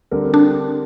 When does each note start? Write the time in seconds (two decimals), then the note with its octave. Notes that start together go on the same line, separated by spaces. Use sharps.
0.11 D3 G3 C4 A#4
0.34 D4